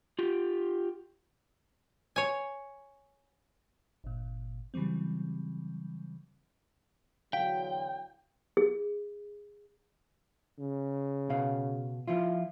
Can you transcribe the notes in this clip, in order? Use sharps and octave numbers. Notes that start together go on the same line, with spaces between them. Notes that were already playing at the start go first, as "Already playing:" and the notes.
F4 G4
C#5 G#5
G1 A#2
C#3 E3 F#3 G3 C4
E2 D3 F#3 F5 G5
G#4
C#3
B2 F5
F3 E4 F4